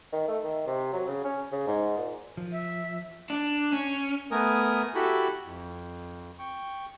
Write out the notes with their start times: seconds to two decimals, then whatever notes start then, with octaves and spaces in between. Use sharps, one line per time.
0.13 D#3
0.28 A3
0.43 D#3
0.67 C3
0.93 F#3
1.08 C#3
1.24 C#4
1.52 C#3
1.67 G#2
1.98 A#2
2.37 F3
2.52 E5
3.30 D4
3.73 C#4
4.31 A3 B3 A#4 G#5 D#6
4.95 E4 F#4 G4 A4 B5
5.46 F2
6.39 G5 C#6